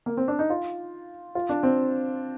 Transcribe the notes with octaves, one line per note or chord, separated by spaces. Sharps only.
A#3
C4
D4
D#4
F4
F4
D4
C4